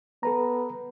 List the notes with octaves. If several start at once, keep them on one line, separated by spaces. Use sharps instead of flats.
B3 A4 B4 A#5